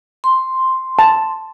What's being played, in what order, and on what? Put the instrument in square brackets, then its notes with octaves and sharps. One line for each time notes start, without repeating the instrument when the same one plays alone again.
[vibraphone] C6
[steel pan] A5